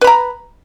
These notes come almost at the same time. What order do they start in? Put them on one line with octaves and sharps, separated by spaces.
B4 B5 A#5